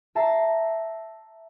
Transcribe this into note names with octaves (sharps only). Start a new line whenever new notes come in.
E5 A5 A#5 C7